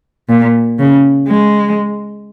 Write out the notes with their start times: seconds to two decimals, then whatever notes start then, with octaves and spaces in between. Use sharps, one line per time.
0.29 A#2
0.79 C#3
1.28 G#3